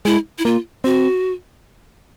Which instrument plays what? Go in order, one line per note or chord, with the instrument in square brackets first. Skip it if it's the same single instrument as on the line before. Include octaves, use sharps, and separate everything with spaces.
[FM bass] G#3 [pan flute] E4
[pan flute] E4
[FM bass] A#3 [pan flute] F4
[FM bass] C4 [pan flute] F#4